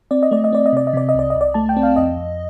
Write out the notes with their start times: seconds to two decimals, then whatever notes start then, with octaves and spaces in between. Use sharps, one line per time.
0.11 C4 D5
0.23 D#5
0.31 A3 D5
0.44 D#5
0.52 C4 D5
0.66 D#5
0.73 C3 D5
0.87 D#5
0.93 C3 D5
1.09 D#5
1.15 C2 D5
1.30 C2 D#5
1.41 D5
1.54 A3 A5
1.69 G5
1.77 C4
1.83 F5
1.96 F2 D#5
2.17 F2